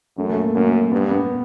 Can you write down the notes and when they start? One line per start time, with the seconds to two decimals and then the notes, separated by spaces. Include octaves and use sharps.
0.17 F#2 A3
0.30 A3
0.36 A#3
0.55 F#2 A#3
0.92 G2 B3
1.11 B3